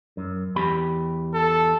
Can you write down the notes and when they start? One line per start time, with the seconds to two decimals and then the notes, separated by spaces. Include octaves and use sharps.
0.17 F#2
0.56 E2 G4 B5
1.34 A4